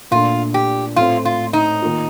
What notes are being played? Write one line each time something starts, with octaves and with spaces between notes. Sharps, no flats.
A#2 A3 D4 F4
G4
A2 A3 C4 F4
F4
D#4
D#3 A#3 F4